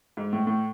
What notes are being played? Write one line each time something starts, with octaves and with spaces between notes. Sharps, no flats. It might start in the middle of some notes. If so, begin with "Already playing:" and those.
G#2
A2
A2